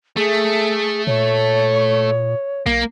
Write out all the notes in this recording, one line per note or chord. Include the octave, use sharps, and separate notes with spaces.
A3 G#4
A#2 C#5
B1 A#3